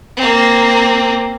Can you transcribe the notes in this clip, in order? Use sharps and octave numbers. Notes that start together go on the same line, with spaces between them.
A#3 C4